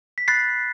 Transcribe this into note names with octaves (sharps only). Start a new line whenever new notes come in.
B6
B5 F#6 A6 C7